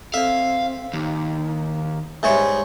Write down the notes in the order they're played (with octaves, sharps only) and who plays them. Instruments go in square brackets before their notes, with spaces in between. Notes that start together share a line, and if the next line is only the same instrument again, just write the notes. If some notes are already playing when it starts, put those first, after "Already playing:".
[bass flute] C4 [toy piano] A4 D5 [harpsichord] E5 [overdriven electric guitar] F5
[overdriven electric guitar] D#2 [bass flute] D#4
[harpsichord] G#2 G#3 C#5 [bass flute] G3 [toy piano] A#4 B4 E5